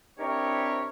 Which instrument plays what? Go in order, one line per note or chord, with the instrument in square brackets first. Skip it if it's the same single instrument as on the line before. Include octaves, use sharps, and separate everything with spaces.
[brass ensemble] C4 D4 E4 G4 A#4 C#5